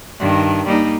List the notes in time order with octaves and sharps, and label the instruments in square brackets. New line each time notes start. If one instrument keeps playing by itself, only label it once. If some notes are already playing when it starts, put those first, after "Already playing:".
[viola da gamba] G2 D#3
G3 A#3 D#4